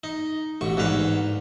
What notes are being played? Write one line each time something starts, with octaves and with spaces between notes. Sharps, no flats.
D#4
A1 B2 C#6
E2 G#2 D3 B4 F5